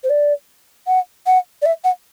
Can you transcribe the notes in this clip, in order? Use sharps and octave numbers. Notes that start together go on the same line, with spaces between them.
C5
D5
F#5
F#5
D5
E5
F#5